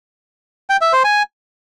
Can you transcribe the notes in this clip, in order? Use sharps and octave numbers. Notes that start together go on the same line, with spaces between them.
G5
E5
C5
G#5